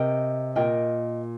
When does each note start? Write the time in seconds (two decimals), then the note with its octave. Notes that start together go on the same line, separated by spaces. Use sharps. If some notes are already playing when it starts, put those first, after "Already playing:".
Already playing: C3 A#4 D#5 G5
0.56 A#2 A#4 D#5 G5